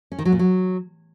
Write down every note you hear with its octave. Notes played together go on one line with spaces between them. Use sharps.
C#4
D#3
F#3
A#2
F#3